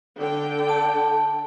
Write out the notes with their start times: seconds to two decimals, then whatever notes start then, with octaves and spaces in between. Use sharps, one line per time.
0.16 D3 G5
0.69 A5